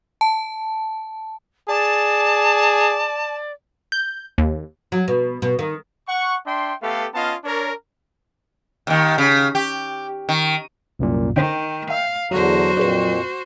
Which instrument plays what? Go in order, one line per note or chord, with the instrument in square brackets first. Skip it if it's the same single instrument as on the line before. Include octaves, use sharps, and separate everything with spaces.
[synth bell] A5
[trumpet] G#4 [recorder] D5 [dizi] A5
[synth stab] G6
D#2
[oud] F#3
B2
B2
D#3
[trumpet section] F#5 C#6
D4 E5 G5 C6
A3 B3 G4 A4 B4 F5
B3 C#4 F4 D#5 F5 A5
D4 A#4 C#5
[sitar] D#2 D#3
C#3
G4
D#3
[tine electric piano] C2 F#2 A#2
[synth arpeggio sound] D3 C#4 C5 [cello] D#3 [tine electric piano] G5
[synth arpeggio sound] E5 [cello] F5
[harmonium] E2 D3 A#5 [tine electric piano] F#3 [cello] F#4 C5
[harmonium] F2 A#2 [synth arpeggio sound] D4 G#4 B4